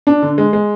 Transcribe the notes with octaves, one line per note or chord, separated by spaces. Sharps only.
D4
D3
G#3
G#3